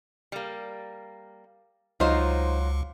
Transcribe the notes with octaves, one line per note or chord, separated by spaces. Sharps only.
G3 A#3
C#2 F#3 D#4 F4 C5